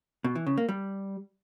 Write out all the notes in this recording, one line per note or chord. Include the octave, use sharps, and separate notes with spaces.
B2
E3
C#3
A#3
G3